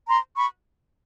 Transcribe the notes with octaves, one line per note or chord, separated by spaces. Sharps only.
A#5 C6
B5 C#6